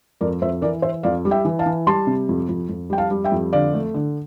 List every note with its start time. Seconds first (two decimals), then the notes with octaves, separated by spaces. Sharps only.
0.21 F2 A#4 D5
0.41 F2 C5 E5
0.62 E3 A#4 D5
0.82 E3 C5 E5
1.03 F2 D5 F5
1.25 G3
1.31 E5 G5
1.45 E3
1.59 F5 A5
1.66 E3
1.87 G3 A5 C6
2.07 C3
2.29 F2
2.49 F2
2.69 F2
2.90 G3 G5
2.98 F5 A5
3.11 G3
3.24 E5 G5
3.32 F2
3.53 D3 D5 F5
3.74 A3
3.94 D3